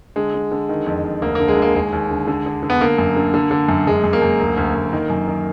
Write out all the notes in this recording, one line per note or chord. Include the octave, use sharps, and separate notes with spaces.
D3 G#3
D3
D3
D#3
F2
F2
D2 A#3
D3 A#3
G#3
D3
A#3
D#2 G#3
D#2
D3
D3
D3
D3
B3
D3 A#3
F#2
D3
D3
D3
F#2
F#2 G#3
F#2
A#3
F#2
D2
D2
D2
D#3
F#2
D#3